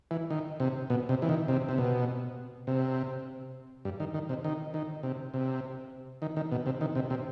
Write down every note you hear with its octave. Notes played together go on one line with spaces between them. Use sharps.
E3
D#3
C3
B2
C3
E3
D#3
C3
C3
B2
C3
G2
D#3
D#3
C3
D#3
D#3
C3
C3
D#3
D#3
B2
C3
D#3
C3
C3